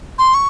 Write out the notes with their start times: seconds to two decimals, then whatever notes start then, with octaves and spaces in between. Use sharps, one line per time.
0.19 C6
0.34 C#6